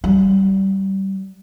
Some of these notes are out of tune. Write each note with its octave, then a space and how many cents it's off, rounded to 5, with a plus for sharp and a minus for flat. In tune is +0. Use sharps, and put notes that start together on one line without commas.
G3 -20